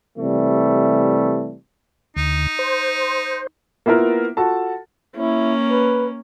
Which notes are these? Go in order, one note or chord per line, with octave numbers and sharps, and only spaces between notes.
C3 E3 G3 A3
D2 D#4
C5
A#3 B3 E4 F4 A#4
F4 F#4 A4 A5
A#3 C#4 E4
B4